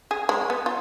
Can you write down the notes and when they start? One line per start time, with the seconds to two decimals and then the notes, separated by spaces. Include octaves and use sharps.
0.11 G#4
0.29 G#3
0.50 B3
0.66 F4